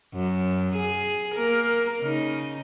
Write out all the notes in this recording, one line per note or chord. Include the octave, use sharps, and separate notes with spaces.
F#2
G#4
A#3 A#4
C#3 D#4